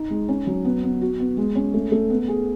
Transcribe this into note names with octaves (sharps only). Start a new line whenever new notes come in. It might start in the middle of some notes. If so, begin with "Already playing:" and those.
Already playing: D#4
G#3
C#4
F#3
B3
B3
F#4
B3
G#3
C#4
A3
A3
B3
G#4